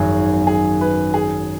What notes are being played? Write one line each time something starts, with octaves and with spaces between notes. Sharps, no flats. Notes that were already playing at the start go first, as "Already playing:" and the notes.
Already playing: G#1 F#2 F#3 B3 G#4
G#4
B4
G#4